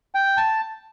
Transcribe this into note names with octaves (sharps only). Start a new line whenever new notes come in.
G5
A5